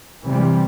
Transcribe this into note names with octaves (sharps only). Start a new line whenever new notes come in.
C3 E3 G3